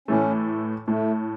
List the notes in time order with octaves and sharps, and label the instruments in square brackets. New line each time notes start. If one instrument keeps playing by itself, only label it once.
[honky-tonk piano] A2 E3 A3 [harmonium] C#4
[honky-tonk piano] A2 [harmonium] A3